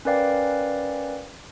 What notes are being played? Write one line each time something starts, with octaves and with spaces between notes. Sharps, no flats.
C#4 A#4 B4 D5 F5 G5